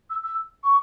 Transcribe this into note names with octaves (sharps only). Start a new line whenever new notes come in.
E6
E6
C#6